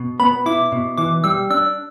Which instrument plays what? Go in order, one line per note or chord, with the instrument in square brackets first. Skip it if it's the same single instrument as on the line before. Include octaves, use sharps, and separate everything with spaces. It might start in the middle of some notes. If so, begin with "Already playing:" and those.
Already playing: [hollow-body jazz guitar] B2
[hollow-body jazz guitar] B3 [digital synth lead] B5
[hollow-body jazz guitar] E4 [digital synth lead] D6
[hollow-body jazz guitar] B2
[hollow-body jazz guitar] E3 [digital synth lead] D6
[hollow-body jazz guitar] G3 [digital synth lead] E6
[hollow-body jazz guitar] D4 [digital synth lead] E6